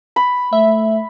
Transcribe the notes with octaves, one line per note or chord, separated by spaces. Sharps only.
B5
A3 E5